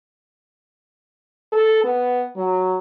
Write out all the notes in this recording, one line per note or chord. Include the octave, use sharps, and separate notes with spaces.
A4
B3
F#3